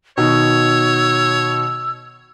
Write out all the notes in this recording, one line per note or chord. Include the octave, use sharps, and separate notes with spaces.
B2 D#3 C#5 E6